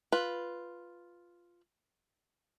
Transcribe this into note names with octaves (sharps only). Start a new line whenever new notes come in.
F4 B4